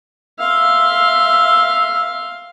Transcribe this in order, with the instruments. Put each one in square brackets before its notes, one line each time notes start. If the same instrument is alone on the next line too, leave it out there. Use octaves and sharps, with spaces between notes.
[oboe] E5 [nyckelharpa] F5 C6